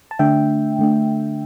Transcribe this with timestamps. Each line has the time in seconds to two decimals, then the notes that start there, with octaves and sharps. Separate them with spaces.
0.11 A5
0.19 D3 A3 D4 E5 G5
0.79 D3 A3 D4